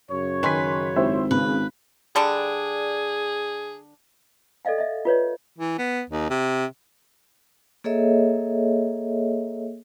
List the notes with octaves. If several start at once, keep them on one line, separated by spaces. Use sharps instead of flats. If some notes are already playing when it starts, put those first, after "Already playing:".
F#2 C#3 C#5
D#3 B4 G#5 C6 B6
G#1 E4 G4 C5
C#3 B4
D3 G3 D4 G#4
A4 D5 D#5 F5 G5
D#5 E5
F4 B4 C#5 D5
E3
B3
D#2
C3
A#3 G#4 A4 C#5 D#5 E5